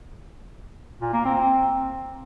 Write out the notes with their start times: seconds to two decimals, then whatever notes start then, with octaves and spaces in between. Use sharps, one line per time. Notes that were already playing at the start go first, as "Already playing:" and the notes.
1.01 A#2
1.13 A#3
1.25 C4